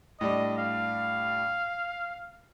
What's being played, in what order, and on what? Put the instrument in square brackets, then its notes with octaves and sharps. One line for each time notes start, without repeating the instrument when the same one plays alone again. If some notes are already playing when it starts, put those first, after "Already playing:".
[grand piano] A2 G3 D4 [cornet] D#5
[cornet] F5